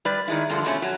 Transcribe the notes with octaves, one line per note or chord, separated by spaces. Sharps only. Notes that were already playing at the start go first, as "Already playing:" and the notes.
G3 B4 D5
D#3 G#3 E4
G2 D3 F3
B2 A3 C#4
F#3